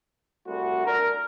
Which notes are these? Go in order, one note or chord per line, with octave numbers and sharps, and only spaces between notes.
C2 A3 F#4
D4 A#4